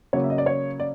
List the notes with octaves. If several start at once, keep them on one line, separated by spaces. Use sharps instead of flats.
C#3 F#3 A#3 C#5
E5
D#5
D5
C#5
D5